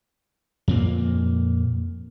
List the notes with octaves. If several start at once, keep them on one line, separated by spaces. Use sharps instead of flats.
F2 A#2 A#3